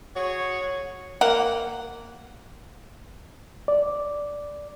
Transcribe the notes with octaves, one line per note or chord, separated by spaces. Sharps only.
F#4 G#4 C#5
A#3 F#5
D5